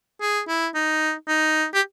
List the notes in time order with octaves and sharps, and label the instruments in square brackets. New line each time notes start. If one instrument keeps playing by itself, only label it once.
[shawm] G#4
E4
D#4
D#4
G4